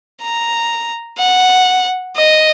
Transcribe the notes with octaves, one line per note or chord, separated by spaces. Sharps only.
A#5
F#5
D#5